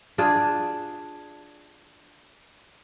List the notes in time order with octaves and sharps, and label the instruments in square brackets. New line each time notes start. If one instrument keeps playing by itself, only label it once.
[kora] D4 F4 G#4